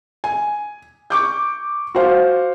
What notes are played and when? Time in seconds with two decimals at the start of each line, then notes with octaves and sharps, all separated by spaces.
0.24 G#5
1.10 C#6 D6 G6
1.95 F#4 C5 F5